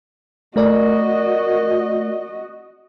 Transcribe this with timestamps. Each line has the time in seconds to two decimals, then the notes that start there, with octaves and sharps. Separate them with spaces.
0.56 A3 F#4 A#4 D5 D#5